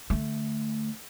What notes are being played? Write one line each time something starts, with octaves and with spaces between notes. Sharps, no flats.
D3 A3